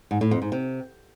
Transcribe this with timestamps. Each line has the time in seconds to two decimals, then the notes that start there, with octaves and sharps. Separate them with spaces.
0.11 G#2
0.21 A2
0.31 F2
0.42 G#2
0.52 C3